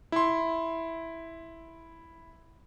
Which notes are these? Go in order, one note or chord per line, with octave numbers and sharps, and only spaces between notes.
E4 C6